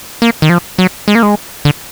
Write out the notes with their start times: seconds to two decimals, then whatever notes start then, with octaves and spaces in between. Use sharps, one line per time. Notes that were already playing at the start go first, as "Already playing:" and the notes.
0.22 A#3
0.42 D#3
0.50 F3
0.78 F#3
1.08 G#3
1.15 A#3
1.23 G#3
1.65 D3